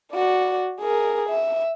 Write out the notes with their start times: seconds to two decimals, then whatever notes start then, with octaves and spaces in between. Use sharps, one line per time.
0.13 F#4 D5
0.80 G#4 A#4
1.30 E5